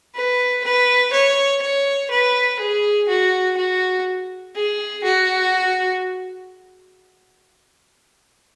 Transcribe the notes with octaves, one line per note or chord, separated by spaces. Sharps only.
B4
B4
C#5
C#5
B4
G#4
F#4
F#4
G#4
F#4